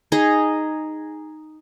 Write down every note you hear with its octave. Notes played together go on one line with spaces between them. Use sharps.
D#4 G#4 D#5